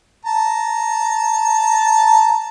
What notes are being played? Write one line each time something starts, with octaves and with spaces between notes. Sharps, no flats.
A5 A#5